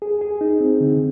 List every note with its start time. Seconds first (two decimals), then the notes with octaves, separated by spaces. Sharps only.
0.02 G#4
0.21 G#4
0.41 D#4
0.61 C4
0.81 D3